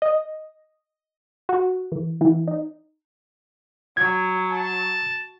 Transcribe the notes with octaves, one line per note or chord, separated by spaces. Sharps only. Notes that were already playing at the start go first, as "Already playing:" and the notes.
D#5
F#4
E3
E3
D#4
F#3 G#6
A5